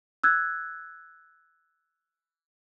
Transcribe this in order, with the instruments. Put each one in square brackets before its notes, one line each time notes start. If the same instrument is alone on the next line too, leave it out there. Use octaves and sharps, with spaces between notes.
[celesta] E6 F#6 G#6